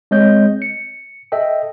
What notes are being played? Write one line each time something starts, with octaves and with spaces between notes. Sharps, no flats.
G#3 C4 C#5 D#5 G6
C#7
A4 D#5 E5 G5